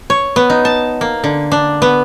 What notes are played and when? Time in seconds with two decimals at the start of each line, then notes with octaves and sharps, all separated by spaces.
0.10 C#5
0.36 B3
0.50 D#4
0.65 A5
1.01 A#3
1.24 D3
1.52 D4
1.82 B3